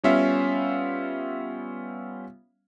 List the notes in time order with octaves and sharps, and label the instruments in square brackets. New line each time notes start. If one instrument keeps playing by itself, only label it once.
[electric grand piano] G3 B3 C#4 F4 E5 F5